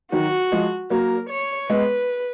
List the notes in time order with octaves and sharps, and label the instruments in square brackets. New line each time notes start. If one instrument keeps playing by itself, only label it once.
[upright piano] D#3 F#3 [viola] F#4
[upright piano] F3 G#3
[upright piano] F#3 A#3 [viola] A#4
[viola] C#5
[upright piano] G#3 B3 [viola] B4